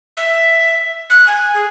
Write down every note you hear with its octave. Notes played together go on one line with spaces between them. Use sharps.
E5
F#6
G#5
G#4